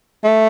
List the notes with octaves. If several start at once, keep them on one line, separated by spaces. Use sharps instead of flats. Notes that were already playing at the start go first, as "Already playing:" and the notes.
A3